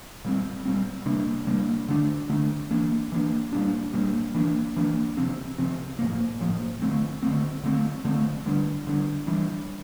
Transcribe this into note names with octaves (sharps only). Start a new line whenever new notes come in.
A#2 G3 C4
A#2 G3 C4
C3 G3 A#3 D4
C3 G3 A#3 D4
D3 A3 D4
D3 A3 D4
E3 A#3 D4
E3 A#3 D4
A#2 G3 A#3 D4
A#2 G3 A#3 D4
E3 A#3 D4
E3 A#3 D4
C3 F3 C4
C3 F3 C4
A2 F3 A#3
A2 F3 A#3
D3 A3 C4
D3 A3 C4
D3 A3 C4
D3 A3 C4
D3 G3 D4
D3 G3 D4
E3 G3 D4